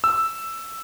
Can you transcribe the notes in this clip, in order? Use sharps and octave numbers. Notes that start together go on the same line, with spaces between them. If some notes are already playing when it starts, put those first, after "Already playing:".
E6